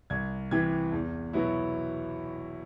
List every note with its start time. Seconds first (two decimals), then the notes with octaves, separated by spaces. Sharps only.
0.10 C2 G#6
0.51 C3 E3 G#6
0.92 E2
1.33 B2 F#3 B3 E4